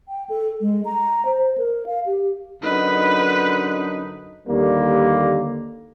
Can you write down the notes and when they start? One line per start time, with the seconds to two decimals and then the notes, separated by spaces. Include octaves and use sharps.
0.08 G5
0.29 A4
0.61 G#3
0.85 A#5
1.25 C5
1.58 A#4
1.86 F5
2.06 G4
2.63 F#2 D3 D#4 B4
4.48 D#2 D3 G3 A#3